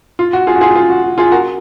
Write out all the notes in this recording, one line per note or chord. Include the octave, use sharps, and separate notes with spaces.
F4
F#4
F4 G#4
F#4
F4 G#4
F4 G#4
F#4
F#4
F4 G#4
F#4 A#4